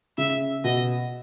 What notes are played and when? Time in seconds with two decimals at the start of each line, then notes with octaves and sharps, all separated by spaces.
0.18 C#3 E5
0.64 B2 D#5